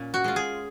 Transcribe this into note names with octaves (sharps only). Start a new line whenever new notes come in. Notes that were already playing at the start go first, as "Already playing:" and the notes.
Already playing: A#2 C#4
F#4
G#3 C#4 F4
G#4